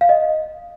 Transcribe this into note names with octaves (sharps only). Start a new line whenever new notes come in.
F5
D#5